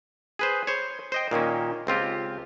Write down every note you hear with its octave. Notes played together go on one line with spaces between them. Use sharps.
G#4 B4 C5
C5 C#5
C5 D#5 G5
A#2 D#3 A#3 C#4
C#2 C4 F4 G4